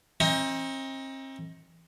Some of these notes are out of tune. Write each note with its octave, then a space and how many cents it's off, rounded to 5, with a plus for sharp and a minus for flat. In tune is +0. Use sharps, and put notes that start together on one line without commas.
C4 +40 D#4 +25